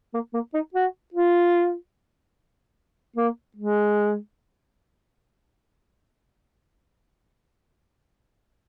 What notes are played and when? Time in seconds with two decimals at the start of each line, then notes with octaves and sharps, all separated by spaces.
0.14 A#3
0.33 A#3
0.54 D#4
0.74 F#4
1.14 F4
3.16 A#3
3.56 G#3